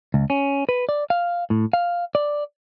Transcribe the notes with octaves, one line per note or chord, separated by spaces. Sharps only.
C#2
C#4
B4
D5
F5
A2
F5
D5